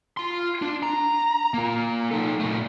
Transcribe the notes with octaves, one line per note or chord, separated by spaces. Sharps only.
F4 C6
D4
A#5
A#3 F4
D#4 A4
A#2 A3